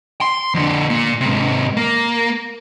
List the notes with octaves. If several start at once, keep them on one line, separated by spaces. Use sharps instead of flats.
C6
F2 D3
A#2
G#2 C3
A#3